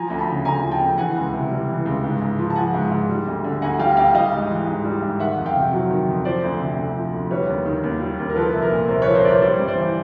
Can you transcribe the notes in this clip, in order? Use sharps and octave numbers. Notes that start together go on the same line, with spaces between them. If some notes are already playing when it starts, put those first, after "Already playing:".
Already playing: F3 G#5 A#5
D2
A5 B5
C#3
D2 G#5 A#5
F3
G5 A5
D2
E3 F#5 G#5
C#2
C3
G3
E3
C#2
G#2
G#2
F3
A5
F3 F#5 G#5
G#2
G#2
G3
D2
D3
D2 F#5 G#5
G3 F5 G5
D2 F5 G5
G3 D#5 F5
G#2
E3
G#2
G3
G#2
D#3 E5 F#5
F2
F5 G5
C3
F#3
D#3
F2
F3 C5 D5
D2
C3
D2
F3
D2
G3 B4 C#5
D#2
D#3
D#2
G3
D#2
A#4
F3 A4 B4
C2
A#4
A#2
C2 A#4 C5
B4 C#5
F3
A#4 C5
C2 B4 C#5 D5
G3 C5 D5
G2
C5 D5
E3